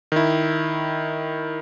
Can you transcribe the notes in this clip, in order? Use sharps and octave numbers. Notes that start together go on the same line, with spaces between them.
D#3 E4